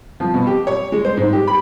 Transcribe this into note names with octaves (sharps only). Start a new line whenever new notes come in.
F3
B2
G4
C#5
G#3
C5
G#2
G4
B5